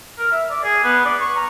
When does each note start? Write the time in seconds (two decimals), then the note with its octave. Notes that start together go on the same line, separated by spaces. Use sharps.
0.18 A#4
0.32 E5
0.51 D5
0.64 G#4
0.84 B3
1.05 D5
1.21 C#6
1.36 A#5